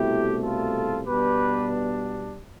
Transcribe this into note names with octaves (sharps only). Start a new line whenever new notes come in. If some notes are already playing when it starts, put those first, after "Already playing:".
Already playing: C2 B2 A3 E4 G4
F4 A4
B2 G3 B3 D4 G4 B4